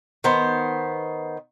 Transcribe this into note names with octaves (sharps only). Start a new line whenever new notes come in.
D#3 B3 C5